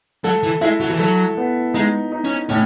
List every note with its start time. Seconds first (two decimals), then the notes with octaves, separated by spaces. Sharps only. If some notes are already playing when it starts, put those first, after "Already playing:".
0.24 F#3 A4
0.43 E3
0.61 G#3 E4
0.81 F#3
0.90 E3
0.99 F#3 A4
1.37 B3
1.74 G#3 D#4
2.12 D#4
2.24 C#4
2.49 A2 C#4